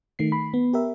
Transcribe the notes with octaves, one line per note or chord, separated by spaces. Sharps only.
D#3 A3 C7
B5
B3
G4 A#4 E5